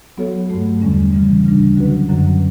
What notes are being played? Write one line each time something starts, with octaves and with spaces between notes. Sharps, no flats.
F#3 B3 F#4 A4 C#5
G2 F#3 A3
E2 D3 G3 C#4
C#3 E3 G3 C#4
D2 C#3 G3 D4
D3 F#3 C#4 F#4 B4
F#2 D3 F#3 C#4